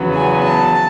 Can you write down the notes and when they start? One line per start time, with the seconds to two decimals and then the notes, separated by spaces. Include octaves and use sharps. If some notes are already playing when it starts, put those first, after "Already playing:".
Already playing: E2 C#3 F#3 B3
0.14 G#5
0.43 A5